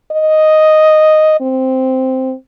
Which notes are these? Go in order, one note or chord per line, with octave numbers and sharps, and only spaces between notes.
D#5
C4